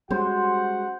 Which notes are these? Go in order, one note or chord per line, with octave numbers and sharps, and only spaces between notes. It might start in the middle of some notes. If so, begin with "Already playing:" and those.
G3 G#3 C#4 F#4 C5 F#5